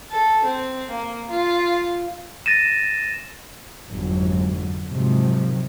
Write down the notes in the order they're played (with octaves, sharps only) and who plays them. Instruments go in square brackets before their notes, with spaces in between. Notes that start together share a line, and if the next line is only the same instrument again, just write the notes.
[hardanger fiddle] A4
C4
A#3
F4
[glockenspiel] A6 A#6 D#7 E7
[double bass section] G1 F2 G#2 D3 F#3
G#2 C3 D#3 F3 F#3